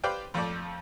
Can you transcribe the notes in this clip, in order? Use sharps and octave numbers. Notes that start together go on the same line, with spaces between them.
G4 B4 C5 D5 F5 G5
F2 F3 A3 A4 D5